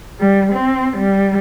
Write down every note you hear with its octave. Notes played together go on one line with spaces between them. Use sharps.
G3
C4
G3